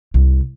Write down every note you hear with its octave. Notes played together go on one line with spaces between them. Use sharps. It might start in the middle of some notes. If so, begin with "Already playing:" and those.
C2